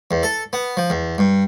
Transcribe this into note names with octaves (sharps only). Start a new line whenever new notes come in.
E2
A4
B3
F3
E2
G2